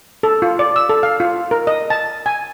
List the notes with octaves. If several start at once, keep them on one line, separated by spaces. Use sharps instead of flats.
A4
F4
D5
E6
A4
F5
F4
A#4
D#5
A5
G#5